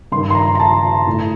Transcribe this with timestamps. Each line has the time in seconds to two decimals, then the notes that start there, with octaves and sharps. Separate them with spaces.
0.12 G2 C6
0.16 D#3
0.30 C6
0.35 A#5
0.55 A#5
0.60 A5
1.07 A2